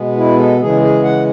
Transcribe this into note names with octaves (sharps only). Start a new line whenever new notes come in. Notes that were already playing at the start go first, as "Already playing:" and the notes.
Already playing: B2 G#3 B3
E4
A4
C#3 E3 G#3 G#4
G#4
F#5